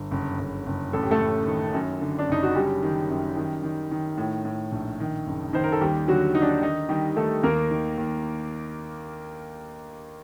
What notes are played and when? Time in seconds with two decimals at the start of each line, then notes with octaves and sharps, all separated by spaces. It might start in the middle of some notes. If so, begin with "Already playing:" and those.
Already playing: G1
0.11 F#1
0.39 F#1
0.66 F#1
0.93 A1 A4
1.02 G4
1.11 A3 A4
1.20 A1
1.47 D#3
1.74 F#2
2.01 D3
2.19 D4
2.29 F#1 D#4
2.43 F#4
2.55 F#2 G3 G4
2.82 D#3
3.10 F#2
3.37 D#3
3.63 D#3
3.91 D#3
4.18 A2
4.45 A2
4.72 A#1
5.00 D#3
5.27 F#1
5.53 D#3 C5
5.64 A#4
5.72 A4
5.81 D#2 G3 G4
6.08 D3 F#3 F#4
6.35 D3 D#4
6.42 D4
6.49 D#4
6.63 D#3 D#4
6.89 D#3 G3 G4
7.16 D#3 A3 A4
7.43 D#2 A#3 A#4
7.71 D#3
7.98 D#2